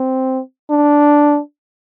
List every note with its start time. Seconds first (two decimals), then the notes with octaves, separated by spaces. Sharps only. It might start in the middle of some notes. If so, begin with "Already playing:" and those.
Already playing: C4
0.70 D4